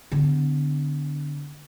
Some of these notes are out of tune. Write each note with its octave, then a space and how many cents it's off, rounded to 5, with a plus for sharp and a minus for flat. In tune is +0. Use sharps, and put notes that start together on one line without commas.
D3 +0 B3 +35